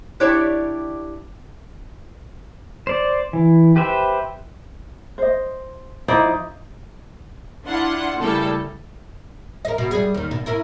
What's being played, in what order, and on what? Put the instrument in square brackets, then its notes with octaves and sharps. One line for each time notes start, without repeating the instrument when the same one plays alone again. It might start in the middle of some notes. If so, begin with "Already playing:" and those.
[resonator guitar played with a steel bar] D4 E4 G4 C#5 D5
[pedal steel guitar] C5 D5
E3
G4 B4 C5 E5
[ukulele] C5 D#5
[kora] F3 E4 D5 [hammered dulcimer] D#4
[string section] D4 E4 F4 F#5 C6
C#3 G3 A3 E4 A4 A#4
[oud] A#4 D#5
B2
G3 G#4
D#2 D#3
B2
C#4 E4 A#4